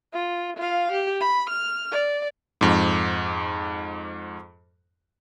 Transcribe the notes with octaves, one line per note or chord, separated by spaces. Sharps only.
F4
F4 F5
G4
B5
F6
D5
F2 G#2